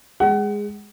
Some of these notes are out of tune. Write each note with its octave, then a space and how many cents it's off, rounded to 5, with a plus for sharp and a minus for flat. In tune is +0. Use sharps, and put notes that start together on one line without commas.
G#3 -10 F#5 +30